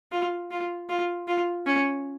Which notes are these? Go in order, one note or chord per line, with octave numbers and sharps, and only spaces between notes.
F4
F4
F4
F4
C#4